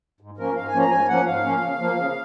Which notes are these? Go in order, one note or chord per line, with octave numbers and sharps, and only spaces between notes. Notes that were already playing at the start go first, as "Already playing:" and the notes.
G#2
F3 A#3 C#4 A#4
G#2 F5
G#5
F3 A#3 C#4
A#5
G#2 G#5
F3 A#3 C#4 F#5
G#2 F5
F3 A#3 C#4
C#3
F3 A#3
C#3